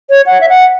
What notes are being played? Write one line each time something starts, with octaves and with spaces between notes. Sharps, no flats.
C#5
F#5
E5
F#5